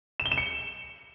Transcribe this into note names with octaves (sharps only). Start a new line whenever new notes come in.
E7
G7
E7
C#7